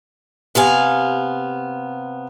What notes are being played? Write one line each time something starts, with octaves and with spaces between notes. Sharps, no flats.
C3 B3 F5 G#5